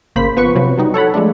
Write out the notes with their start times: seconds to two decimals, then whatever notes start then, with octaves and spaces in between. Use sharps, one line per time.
0.16 G#1 C#3 A#3 C5 B5 B6
0.36 F3 B3 B4 C#6
0.55 C3 F3 F#3
0.77 F#3 G3 D#4
0.94 A4 C#5 F#5 B5
1.14 F3 G#3 A3 D4